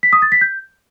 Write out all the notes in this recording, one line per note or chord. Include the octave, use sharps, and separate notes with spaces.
B6
D#6
A6
B6
G6